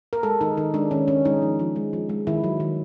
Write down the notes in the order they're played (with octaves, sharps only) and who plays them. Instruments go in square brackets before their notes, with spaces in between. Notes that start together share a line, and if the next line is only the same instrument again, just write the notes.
[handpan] A#4
G#3 A4
D#3 D#4
D#3 D#4
G#3 D4
D#3 C#4
D#3 C#4
G#3 D#4
F3
F3
G#3
F3
G#3
D#3 E4
F#3
D#3